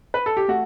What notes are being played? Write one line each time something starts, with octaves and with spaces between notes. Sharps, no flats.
B4
A4
G4
A3 F#4